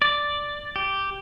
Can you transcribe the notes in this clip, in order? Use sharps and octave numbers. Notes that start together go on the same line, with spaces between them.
D5
G4